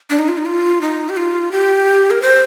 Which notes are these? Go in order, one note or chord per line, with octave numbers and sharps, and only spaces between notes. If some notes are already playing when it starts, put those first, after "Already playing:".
D4
D#4
F4
D#4
F4
D#4
G4
F4
G4
A#4
C5